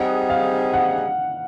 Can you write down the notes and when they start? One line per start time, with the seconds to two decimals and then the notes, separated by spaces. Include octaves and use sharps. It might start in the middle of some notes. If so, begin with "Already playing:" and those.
Already playing: G3 C4 D#4 G#4 F#5
0.30 F5
0.74 F#5